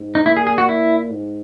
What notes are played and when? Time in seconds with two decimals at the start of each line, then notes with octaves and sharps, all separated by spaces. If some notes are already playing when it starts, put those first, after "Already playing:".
Already playing: G#2
0.15 D#4
0.25 A#2 E4
0.37 G#4
0.47 G#4
0.58 F#4
0.69 E4
1.12 G#2